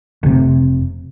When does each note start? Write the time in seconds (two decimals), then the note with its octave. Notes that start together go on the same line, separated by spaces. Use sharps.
0.23 F1 C3